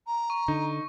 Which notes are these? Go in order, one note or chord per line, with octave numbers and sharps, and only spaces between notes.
A#5
C#6
D3 D#4